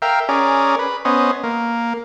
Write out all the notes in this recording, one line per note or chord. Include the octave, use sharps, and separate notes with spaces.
A#4 E5 F5 G5
C#4 G#4 A#4 D5
B4
B3 C#4 C5 D#5
A#3